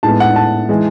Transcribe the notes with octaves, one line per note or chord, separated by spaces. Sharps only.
A2 G#3 B3 A5
F#5
A5
E3 G#3